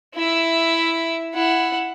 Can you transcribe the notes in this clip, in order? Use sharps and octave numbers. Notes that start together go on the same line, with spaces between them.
E4 E5
E4 F#5